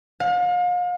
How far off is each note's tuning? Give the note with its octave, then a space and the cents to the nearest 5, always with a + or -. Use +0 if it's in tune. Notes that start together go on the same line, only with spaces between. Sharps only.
F5 +40